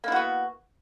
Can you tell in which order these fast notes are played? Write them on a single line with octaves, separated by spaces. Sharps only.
A#3 E4 F#4 B3